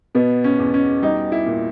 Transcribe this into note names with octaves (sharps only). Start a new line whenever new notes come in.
B2 B3
C#4
E2
C#4
G3 D#4
E4
A#2